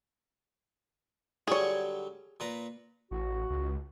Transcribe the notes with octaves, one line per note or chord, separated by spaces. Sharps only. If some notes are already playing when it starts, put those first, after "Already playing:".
D3 F#3 G3 G#4 C#5
A#2 B4 A#5
A1 F#4
C#2